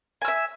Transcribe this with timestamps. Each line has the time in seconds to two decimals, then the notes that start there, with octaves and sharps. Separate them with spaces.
0.22 G#5
0.25 E6
0.28 E5